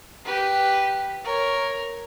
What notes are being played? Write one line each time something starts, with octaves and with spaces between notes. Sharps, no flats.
G4 B4
A#4 C#5